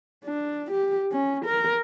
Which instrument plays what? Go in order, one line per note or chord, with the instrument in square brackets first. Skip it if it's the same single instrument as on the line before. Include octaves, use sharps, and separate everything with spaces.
[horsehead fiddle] D4
G4
C#4
A#4